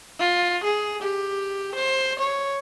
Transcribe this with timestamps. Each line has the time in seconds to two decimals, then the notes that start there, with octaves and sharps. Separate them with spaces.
0.20 F4
0.64 G#4
1.02 G4
1.75 C5
2.19 C#5